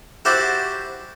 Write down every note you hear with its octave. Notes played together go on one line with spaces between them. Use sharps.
E4 F#4 G4 C5 D5